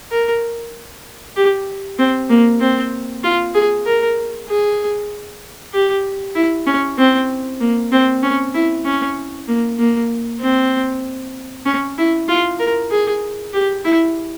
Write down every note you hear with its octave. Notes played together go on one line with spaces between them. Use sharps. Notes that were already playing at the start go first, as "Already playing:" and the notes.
A#4
G4
C4
A#3
C4
F4
G#4
A#4
G#4
G4
E4
C#4
C4
A#3
C4
C#4
E4
C#4
A#3
A#3
C4
C#4
E4
F4
A#4
G#4
G4
E4